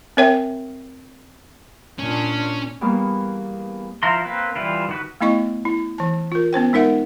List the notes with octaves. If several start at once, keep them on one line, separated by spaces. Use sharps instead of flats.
C4 A#4 C#5 E5 G5
A#2 C#4 D4
E2 G3 A#3 B3 F5 C#6
F3 E4 F5 A#5 C6
A#3 C4 B4
E3 G3 E4 F4
D#3 F#4 B4
A3 B3 E4 D#5 C#6
E4
E3 A5
F4 A#4
B3 C#4 C5 G5
G#3 D#4 A#4 E5 F#5